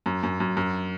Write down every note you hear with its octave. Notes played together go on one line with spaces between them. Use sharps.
F#2
F#2
F#2
F#2